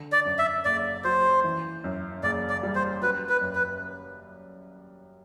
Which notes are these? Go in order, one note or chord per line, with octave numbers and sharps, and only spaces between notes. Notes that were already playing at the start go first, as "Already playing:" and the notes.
Already playing: D3
D5
F#2
E5
F#1 D5
F#3 C5
E3
F#2
F#1 D5
D5
G3
C5
F#3 B4
B4
F#2
B4